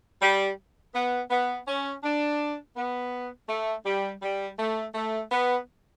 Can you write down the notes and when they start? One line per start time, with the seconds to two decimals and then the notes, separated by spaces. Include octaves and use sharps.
0.22 G3
0.94 B3
1.30 B3
1.67 C#4
2.03 D4
2.76 B3
3.49 A3
3.85 G3
4.22 G3
4.59 A3
4.94 A3
5.31 B3